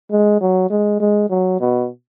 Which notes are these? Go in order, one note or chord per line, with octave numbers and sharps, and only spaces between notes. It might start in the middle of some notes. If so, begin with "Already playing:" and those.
G#3
F#3
G#3
G#3
F#3
B2